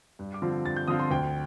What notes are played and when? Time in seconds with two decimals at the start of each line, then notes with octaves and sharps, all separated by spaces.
0.19 G2
0.34 D6
0.42 D3 F3 C4 F4
0.65 G2 A6
0.76 G6
0.88 D3 F3 C4 F4 D#6
1.00 C6
1.11 D2 G5